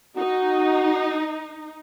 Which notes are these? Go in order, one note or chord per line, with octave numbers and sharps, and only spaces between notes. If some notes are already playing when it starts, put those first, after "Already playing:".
D#4 F#4